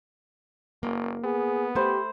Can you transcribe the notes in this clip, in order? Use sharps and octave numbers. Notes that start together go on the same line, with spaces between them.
F#1 A#3
B3 G#4
A3 G4 C5 B5